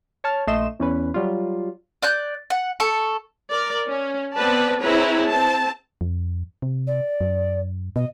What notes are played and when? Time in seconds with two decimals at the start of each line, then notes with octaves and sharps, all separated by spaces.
0.24 C#5 A5 F6
0.47 A#1 A3 D#5 C6 E7
0.79 E2 C#4 B4
1.14 F#3 G3 F4
2.02 D5 F#6 G6
2.50 F#5
2.80 A4 C#6
3.50 A#4 D5
3.88 C#4
4.35 B3 C4 B4 D5 A5
4.81 C4 E4 G#4 B4 C#5 A#5
5.26 C4 A5
6.01 F2
6.62 C3
6.87 D5
7.21 F#2
7.96 B2 D#5